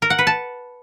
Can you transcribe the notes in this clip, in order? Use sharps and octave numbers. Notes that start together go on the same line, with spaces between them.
A#4
F#5
B4
A5